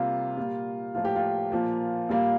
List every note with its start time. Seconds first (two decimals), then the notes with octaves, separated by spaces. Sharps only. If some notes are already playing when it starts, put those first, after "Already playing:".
Already playing: C3 G3 A#3 F4
0.37 A#2 G3 A#3
0.95 A2 F3 A#3 F4
1.05 G4
1.16 F4
1.52 A#2 F3 A#3
2.09 A#2 G3 A#3